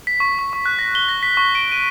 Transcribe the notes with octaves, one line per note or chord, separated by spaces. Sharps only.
B6
C#6
C#6
C#6
F#6
A#6
G7
A#6
B6
C#6
D7
D#7